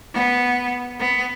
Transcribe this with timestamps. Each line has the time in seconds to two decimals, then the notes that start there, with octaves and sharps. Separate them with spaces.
0.14 B3
1.00 B3